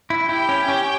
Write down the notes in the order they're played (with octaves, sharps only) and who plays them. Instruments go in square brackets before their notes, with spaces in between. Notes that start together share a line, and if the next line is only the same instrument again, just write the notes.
[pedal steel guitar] E4
[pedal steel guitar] E4 [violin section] G4 G5
[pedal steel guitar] C#4
C#4